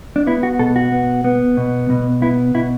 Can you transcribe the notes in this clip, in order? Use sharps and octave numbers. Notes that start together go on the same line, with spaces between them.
D4
B3 E4
F#4
B2 A4
F#4
B3
B3
B2
B2
B3 E4
B2 E4